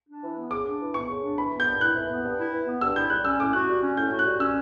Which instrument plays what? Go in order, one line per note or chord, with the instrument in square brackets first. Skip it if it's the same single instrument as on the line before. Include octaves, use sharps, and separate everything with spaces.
[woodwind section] D4
E3
B3
[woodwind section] C#3 [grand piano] D6
[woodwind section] D4
E3
[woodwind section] B3 [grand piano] C#6
[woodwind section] C#3
D4
[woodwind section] E3 [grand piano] B5
[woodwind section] B3
[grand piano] G6
[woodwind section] G2
[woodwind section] E4 [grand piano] F#6
[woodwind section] E3
B3
G2
E4
E3
B3
[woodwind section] G2 [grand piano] E6
[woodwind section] E4 [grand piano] G6
[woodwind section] G3 [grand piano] F#6
[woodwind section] C#4 [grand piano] E6
[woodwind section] A2 [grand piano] D6
[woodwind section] F#4 [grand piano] F#6
[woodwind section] G3
C#4
[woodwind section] A2 [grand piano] G6
[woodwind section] F#4
[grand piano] F#6
[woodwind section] G3
[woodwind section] C#4 [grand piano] E6